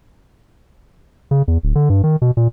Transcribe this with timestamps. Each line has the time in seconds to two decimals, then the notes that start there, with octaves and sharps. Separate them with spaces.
1.31 C#3
1.48 E2
1.63 D1
1.75 D3
1.90 G2
2.04 D#3
2.22 B2
2.37 A#2